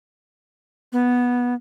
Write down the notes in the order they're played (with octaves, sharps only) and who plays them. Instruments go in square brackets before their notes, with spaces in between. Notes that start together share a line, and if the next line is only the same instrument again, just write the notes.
[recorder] B3